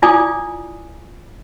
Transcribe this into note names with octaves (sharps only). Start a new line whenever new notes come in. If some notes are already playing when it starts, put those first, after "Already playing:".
E4 F4 D5 G#5 D6 D#6